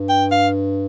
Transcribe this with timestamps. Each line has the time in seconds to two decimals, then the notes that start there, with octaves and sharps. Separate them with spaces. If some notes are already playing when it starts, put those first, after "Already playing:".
Already playing: G2
0.09 G5
0.31 F5